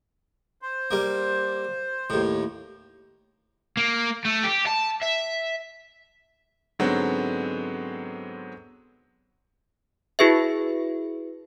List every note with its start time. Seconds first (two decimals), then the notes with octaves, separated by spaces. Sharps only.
0.62 C5
0.91 G3 A#3
2.10 D#2 A2
3.77 A#3
4.25 A3
4.44 G4
4.67 A5
5.03 E5
6.79 G#2 D3 F#3 G#3 B3 C4
10.19 E4 F#4 G#4 B4 E5